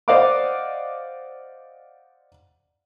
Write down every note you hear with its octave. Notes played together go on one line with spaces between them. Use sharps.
C5 D5 D#5 F5 F#5 D6